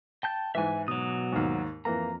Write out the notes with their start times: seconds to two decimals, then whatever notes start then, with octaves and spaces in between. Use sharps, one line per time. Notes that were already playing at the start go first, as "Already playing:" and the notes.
0.23 G5 A5 G6
0.55 G#2 E3 E5 G#5
0.88 B2 F#3 D#6
1.32 D#2 G#2
1.85 F2 E3 A#3 A#5